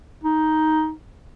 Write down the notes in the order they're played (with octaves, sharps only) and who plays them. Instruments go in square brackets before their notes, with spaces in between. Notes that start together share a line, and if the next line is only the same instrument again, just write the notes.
[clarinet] D#4